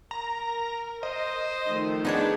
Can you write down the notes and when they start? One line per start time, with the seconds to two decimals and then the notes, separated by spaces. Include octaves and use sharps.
0.11 A#4 A#5
1.03 C5 D#5
1.68 D#3 F3 A3
2.05 B3 D4 D#4 G#4 C#5